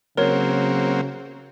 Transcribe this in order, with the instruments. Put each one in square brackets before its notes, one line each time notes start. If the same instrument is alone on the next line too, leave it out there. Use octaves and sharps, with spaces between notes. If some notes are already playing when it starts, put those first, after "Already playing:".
[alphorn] C#3 [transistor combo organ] F#3 A#3 C4 [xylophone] A#4 C#5